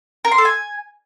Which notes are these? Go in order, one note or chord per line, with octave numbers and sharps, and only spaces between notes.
A#4
C6
A4
G#5